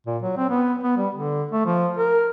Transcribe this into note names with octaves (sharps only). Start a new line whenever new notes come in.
A#2
F#3
C4
B3
B3
G3
D3
A3
F3
A#4